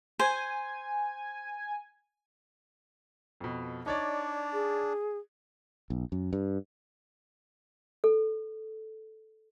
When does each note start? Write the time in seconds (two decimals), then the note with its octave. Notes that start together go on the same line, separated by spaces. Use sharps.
0.19 C5 G#5
3.40 F2 B2
3.86 D4 D#4 C#5 D5
4.53 G#4
5.90 B1
6.12 F#2
6.33 G2
8.04 A4